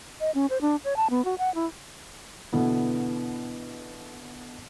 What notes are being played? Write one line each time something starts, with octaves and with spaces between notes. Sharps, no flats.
D#5
C#4
C5
D4
C#5
A5
B3
F#4
F#5
E4
B2 D3 E3 B3